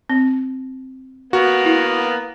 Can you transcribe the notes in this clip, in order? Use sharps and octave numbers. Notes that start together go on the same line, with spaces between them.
C4
A#3 B3 F#4
E4